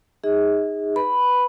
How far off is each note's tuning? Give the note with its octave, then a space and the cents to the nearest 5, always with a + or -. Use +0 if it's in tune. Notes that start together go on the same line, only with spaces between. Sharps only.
D#4 +0 G#4 -20 D#5 +45
B4 +0 B5 +0